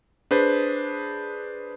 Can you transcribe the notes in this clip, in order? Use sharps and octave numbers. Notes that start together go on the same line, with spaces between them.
D4 G#4 B4 C5